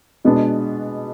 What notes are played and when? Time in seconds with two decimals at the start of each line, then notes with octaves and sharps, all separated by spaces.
0.25 B2 G#3 B3 D4